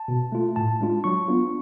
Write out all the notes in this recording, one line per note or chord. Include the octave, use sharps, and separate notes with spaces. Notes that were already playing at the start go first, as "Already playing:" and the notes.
Already playing: A5
B2
A3 F4
A2 A5
G#3 D4 F4
F#3 C#6
B3 D4 F4